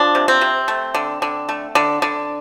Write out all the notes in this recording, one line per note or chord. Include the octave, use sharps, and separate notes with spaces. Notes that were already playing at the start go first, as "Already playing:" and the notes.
Already playing: F3 D4
C3
C4
C3
A3
D3
D3
A3
D3
D3